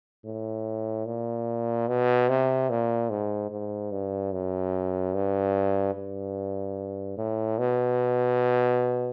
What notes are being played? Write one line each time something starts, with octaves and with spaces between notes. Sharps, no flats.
A2
A#2
B2
C3
A#2
G#2
G#2
G2
F#2
G2
G2
A2
B2